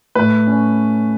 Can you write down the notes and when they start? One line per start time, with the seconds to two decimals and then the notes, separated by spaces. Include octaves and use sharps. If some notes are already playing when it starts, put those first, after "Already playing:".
0.15 A2 B4
0.47 C#4